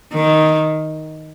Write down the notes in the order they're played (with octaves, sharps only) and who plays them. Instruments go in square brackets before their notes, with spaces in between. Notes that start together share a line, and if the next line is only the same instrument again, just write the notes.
[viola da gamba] D#3